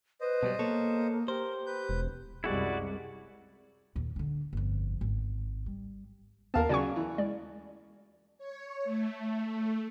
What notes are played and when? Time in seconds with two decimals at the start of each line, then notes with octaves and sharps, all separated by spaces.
0.21 B4 C5 D#5
0.43 B2 F#3 G3
0.59 A#3 B3 A4 C#5
1.28 G4 A#4 C5
1.66 B4 G6
1.89 E1
2.44 C2 F#2 G3 G#3 E4 F#4 D5
3.96 D#2 A#2
4.16 D3 D4
4.53 G1 F2
5.01 G#1
5.66 G3
6.54 D#2 B3 A#4 F5 A5
6.69 C#3 F#3 D5 G#5 C#6
6.96 E3
7.18 G#3 D5
8.38 C#5
8.84 A3